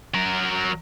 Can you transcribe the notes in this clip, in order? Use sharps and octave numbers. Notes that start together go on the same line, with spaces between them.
F#3 A#4